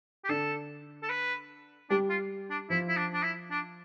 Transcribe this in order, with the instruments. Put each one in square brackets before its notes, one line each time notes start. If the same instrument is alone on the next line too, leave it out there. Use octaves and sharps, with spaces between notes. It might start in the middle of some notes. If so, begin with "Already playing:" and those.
[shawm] G4
[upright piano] D3 D4 [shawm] A4
[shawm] A4
B4
[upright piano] G3 G4 [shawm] D4
[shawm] F4
D4
[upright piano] F3 F4 [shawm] E4
[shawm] E4
D4
D4
E4
D4